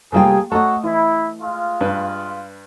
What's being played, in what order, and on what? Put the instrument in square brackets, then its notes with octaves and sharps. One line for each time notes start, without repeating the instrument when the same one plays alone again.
[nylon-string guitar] C3 G3 G5 [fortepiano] A3 A#3 F4 [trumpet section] G#4
[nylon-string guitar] A3 D#5 [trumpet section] C#4 F#4 [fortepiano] A4 A#5
[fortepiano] E3 [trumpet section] E4
[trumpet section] G#3 F4
[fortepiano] G2 B4